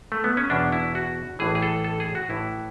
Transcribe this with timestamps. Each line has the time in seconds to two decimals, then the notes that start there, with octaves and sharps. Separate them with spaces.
0.12 A3
0.24 B3
0.37 C#4
0.50 E2 B2 D4
0.72 E4
0.95 F#4
1.39 A1 A2 E3 G#4
1.55 G#4
1.62 A4
1.84 A4
2.00 G#4
2.15 F#4
2.29 A1 A2 E3 E4